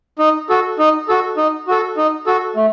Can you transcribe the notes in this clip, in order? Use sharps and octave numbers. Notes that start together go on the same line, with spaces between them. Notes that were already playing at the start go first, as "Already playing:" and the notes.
D#4
F#4 A4
D#4
F#4 A4
D#4
F#4 A4
D#4
F#4 A4
A3